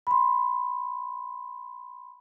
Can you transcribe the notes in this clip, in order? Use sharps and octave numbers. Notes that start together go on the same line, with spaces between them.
B5 C6